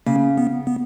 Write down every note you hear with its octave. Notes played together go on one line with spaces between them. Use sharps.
C#3 A#3
B3
B3